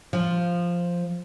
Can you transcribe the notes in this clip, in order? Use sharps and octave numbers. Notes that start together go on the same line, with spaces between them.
F3